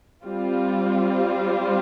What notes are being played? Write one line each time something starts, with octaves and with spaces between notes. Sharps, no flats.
G3 C4 F4